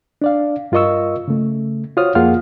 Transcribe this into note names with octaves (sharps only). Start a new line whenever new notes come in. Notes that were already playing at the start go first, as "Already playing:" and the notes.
D4 D5 F5
G2 F4 A#4 D#5 C#6 E6
C#3 A3
F4 F#4 C5 C#5 D#6 F6
F2 A#3 F4 G#4 F#5 F6